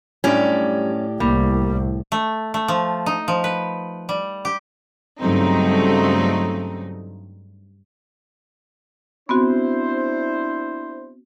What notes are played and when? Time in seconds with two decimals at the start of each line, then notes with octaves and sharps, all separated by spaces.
0.24 F#2 A2 G3 C#4 D4 G4 D5
1.20 C2 G3 A#3
2.12 A3
2.54 A3
2.68 F3
3.06 D#4
3.28 F3
3.44 B4
4.09 G3
4.45 G4
5.20 G2 C#3 F#3 A3 C4 D#4
9.29 B3 C4 D4 E4 F#4 C5